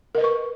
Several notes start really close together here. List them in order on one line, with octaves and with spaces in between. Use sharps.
A#4 D#5 B4 C#6